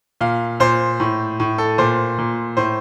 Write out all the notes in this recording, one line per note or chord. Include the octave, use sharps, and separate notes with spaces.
A#2 F5
A#2 C5
A2
A2
A4
A#2 C5
A#2
A2 C5